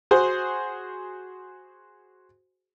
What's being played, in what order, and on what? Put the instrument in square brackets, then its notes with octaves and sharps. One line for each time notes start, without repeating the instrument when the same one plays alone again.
[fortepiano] F#4 G#4 C5